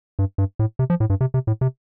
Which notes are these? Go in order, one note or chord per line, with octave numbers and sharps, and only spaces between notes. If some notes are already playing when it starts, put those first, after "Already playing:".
G2
G2
A2
C3
F3
A2
G2
C3
C3
A2
C3